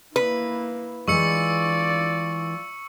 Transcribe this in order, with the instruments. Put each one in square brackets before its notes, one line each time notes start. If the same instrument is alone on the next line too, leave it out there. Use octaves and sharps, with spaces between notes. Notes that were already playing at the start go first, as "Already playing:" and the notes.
[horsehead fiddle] A#3 E4 [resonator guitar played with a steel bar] B4
[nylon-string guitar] E3 G#3 [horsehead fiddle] F4 D5 [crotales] C#6 E6 C#7